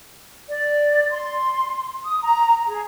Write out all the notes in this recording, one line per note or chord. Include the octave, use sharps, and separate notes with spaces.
D5
C6
D#6
A#5
G#4